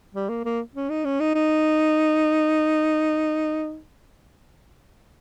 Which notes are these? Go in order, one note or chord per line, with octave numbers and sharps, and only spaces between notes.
G3
A#3
A#3
C#4
D#4
C#4
D#4
D#4